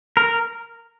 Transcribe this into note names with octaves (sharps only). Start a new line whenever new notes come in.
A#4